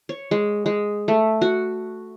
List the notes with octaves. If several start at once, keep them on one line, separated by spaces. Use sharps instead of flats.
C#5
G#3
G#3
A3
F#4